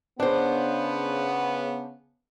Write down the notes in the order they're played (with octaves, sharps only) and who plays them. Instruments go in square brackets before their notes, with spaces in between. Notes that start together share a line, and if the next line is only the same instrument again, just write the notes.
[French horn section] C#3 B3 [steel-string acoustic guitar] D4 C5